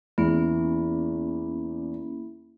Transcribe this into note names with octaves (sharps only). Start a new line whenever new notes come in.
E2 A#3 C#4 E4